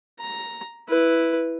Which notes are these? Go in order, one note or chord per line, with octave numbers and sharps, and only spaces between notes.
A#5
E4 B4